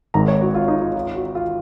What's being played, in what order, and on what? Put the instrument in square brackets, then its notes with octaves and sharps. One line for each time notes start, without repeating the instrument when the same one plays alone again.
[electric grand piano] G#1 G#2 D#3 [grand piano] A#5
[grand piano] C#5
F#4
F4
D#4
F4
F4
F#4
F4